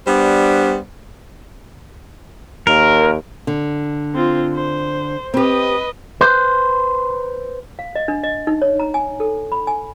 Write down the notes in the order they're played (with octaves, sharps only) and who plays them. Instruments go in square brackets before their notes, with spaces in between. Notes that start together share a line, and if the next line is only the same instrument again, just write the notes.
[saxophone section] G3 B3 D4 C5
[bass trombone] D#2 [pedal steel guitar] A#4
[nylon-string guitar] D3
[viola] C4 F4
C5
[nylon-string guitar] C4 G4 [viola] B4 D#5
[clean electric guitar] B4 C5
[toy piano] F5
D#5
D4
D#5
D#4
C#5
A#5
G#5
A4
B5
G#5